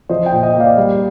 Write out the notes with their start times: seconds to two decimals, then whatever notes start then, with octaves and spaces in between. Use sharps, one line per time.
0.09 F3 C5 D#5
0.26 D#5 G5
0.32 A#2
0.43 D#5 G5
0.55 A#3
0.60 D5 F5
0.77 G3